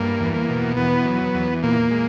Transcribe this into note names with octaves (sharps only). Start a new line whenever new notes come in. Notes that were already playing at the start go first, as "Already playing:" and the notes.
Already playing: G2 A#3
E2
A#3
B2
E2 B3
F#3
E2
A#2 A#3
G#3